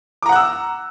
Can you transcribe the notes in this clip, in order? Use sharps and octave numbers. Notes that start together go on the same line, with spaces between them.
F#5 A#5 D6 E6 F#6